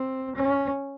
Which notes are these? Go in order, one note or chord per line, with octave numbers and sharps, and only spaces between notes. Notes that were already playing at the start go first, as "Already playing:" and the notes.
Already playing: C4
C#4